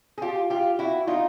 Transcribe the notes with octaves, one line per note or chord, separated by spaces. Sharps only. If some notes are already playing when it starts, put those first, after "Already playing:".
G#4
F4 G4
F4 G4
E4 F#4
D#4 F4